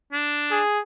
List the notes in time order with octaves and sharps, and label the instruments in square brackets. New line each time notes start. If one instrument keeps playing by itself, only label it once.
[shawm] D4
[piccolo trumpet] G#4